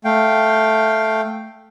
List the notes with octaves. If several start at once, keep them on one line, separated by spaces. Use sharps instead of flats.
A3 F5 G5